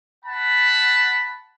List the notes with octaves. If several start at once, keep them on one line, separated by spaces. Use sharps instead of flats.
F#5 A5 B5